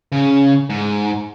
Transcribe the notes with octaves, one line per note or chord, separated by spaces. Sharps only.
C#3
G#2